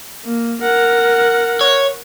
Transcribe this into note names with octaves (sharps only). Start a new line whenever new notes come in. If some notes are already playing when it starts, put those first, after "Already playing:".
A#3
A#4 F#5
C#5